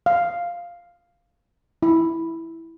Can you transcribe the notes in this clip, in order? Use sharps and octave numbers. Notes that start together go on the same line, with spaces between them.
F5
E4